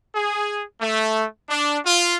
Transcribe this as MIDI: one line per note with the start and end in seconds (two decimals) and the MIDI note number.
0.15 0.62 68
0.80 1.25 57
1.49 1.78 62
1.86 2.18 65